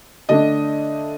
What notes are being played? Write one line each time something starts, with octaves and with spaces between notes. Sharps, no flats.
D3 A3 D4 D#5